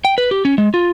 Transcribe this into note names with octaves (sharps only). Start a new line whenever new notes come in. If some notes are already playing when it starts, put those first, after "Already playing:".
G5
B4
G4
C#4
G#3
F4